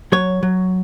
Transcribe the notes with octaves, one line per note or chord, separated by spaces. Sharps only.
F#3 C#5
F#3